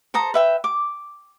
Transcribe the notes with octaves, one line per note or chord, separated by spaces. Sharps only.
A4 C5 A#5 D#6
B4 E5 G5
D6